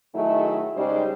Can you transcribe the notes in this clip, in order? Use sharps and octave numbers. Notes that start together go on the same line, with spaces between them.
D#3 F#3 A3 E4 G#4 D#5
C#3 G3 G#3 D#4 G4 C5